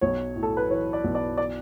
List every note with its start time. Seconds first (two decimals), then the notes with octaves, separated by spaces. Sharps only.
0.01 B1 C#5
0.36 A2
0.43 A4
0.57 B4
0.69 E3 C#5
0.93 D5
1.04 B1
1.15 D5
1.37 D5